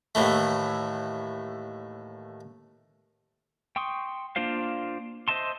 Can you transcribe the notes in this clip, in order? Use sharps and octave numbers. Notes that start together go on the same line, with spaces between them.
D#2 A2 E3 A3
G5 C6 C#6 D#6
A#3 D4 F4 C5 F5
C5 D#5 E5 A5 C6